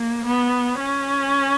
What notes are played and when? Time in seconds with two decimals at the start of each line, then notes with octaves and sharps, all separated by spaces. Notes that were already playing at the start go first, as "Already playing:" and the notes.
Already playing: A#3
0.25 B3
0.80 C#4